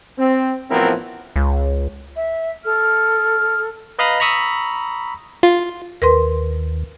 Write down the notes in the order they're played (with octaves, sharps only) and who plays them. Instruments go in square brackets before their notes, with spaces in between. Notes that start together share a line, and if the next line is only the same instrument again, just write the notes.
[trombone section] C4
A1 F3 B3 C4 E4 A#4
[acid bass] C#2
[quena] E5
[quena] A4 [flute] F6
[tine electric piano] B4 D#5 F5 A#5 B5 D#6
A#5 B5 C#6 D#6 E6 B6
[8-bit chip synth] F4
[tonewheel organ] D#2 [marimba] A#4 B4 C6